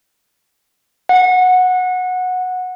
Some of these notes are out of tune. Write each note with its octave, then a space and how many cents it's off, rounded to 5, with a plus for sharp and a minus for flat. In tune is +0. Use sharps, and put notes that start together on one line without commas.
F#5 -15